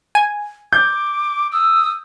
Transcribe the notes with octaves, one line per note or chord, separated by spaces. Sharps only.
G#5
D6 G6
D#6 E6